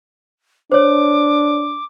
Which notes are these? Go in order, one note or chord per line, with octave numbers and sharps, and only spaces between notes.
D4 C5 C#5 D6